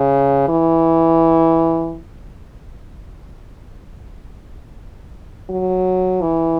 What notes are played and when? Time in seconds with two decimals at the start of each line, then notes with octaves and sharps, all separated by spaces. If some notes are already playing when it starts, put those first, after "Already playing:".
Already playing: C#3
0.48 E3
5.50 F#3
6.22 E3